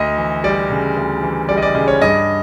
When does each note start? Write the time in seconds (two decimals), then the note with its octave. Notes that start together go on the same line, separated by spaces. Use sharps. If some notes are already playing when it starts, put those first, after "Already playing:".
Already playing: D2 D#5
0.17 E3
0.44 G3 D5
0.70 C#3
0.97 D2
1.23 E3
1.49 G3 D5
1.57 D#5
1.62 D5
1.75 C#3 D#5
1.88 C#5
2.01 G2 D#5